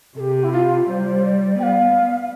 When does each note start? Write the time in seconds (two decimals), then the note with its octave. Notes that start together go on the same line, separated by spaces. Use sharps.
0.17 C3 G4 A4
0.44 E4
0.52 F4
0.88 G3 C5
1.22 D5
1.58 B3 G5
1.63 F5